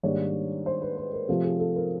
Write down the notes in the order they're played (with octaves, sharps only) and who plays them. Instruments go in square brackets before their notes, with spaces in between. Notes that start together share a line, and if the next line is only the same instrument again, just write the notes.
[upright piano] G#2 D#3 G3 A#3 D4 C#5
C5
B4
B4
A#4
C3 F3 A3 A4
G#4
A4
A#4